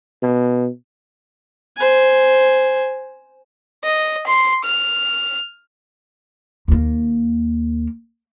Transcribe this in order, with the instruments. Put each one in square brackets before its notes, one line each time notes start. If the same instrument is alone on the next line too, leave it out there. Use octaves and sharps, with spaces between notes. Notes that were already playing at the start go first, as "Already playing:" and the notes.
[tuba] B2
[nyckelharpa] C5 G#5
[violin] D#5
C6
F6
[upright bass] D#2 A#3